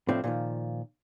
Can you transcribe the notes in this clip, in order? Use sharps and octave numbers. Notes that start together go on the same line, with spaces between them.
A2 F3 A3 C4 D4
A#2 D#3 F3